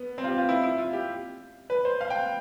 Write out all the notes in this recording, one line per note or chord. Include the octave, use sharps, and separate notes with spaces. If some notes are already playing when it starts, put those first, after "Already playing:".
Already playing: B3
C4
F4
G4
F4
E4
E4
F4
G4
B4
C5
F5
G5